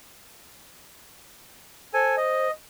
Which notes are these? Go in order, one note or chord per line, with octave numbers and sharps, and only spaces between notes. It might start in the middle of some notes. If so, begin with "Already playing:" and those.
A4 C5 G#5
D#5